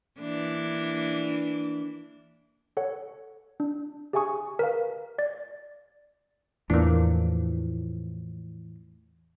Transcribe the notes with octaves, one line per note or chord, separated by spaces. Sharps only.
E3 A#3 D4
A4 C#5 F#5
D4
G4 G#4 E5 G#5 C#6 D#6
A#4 B4 F5
D5 A6
E2 A2 E3 F3 A#3 D4